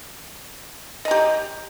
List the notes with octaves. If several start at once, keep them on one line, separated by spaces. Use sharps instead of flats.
G4 D#5 A#5